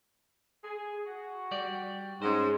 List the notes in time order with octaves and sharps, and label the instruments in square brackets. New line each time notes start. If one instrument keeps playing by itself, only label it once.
[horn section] G#4
F#4
[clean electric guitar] G3 G4 D5
[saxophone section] G#2 [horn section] G#3 [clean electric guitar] C#4 C5